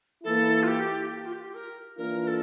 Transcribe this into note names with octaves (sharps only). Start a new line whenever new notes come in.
E3 A#3 E4 A4
F4
G4
G4
F4
G4
A#4
E3 A#3 D4 F4 A#4
A4